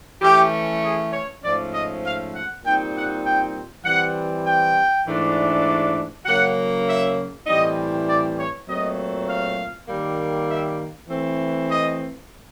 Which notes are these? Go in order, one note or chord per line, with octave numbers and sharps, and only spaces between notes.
E3 A3 C#4 G4
G#4
C#5
G#2 F3 A3 C#4 D5
D#5
F5
F#5
A#2 G3 C4 D#4 G5
F#5
G5
E3 G3 C4 F#5
G5
G#2 E3 A3 D4
C#3 F#3 A#3 C#4 F#5
E5
A2 E3 G3 C4 D#5
D5
C#5
A#2 F#3 A3 C4 D#5
F5
D#3 G3 A#3
E5
E3 A3 C4
D#5